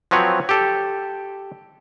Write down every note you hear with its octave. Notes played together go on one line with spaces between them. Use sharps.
F3 F#3 C4 B4 C#5
G4 A4